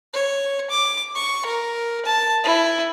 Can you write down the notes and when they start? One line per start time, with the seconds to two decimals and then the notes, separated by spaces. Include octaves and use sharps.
0.13 C#5
0.70 D6
1.15 C#6
1.46 A#4
2.05 A5
2.44 E4